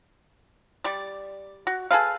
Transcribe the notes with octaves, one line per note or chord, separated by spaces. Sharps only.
G3 D5
F#4
G#4 A4 B4 F5